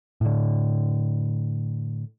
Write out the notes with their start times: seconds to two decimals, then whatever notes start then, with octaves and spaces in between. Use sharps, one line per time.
0.21 A2 D3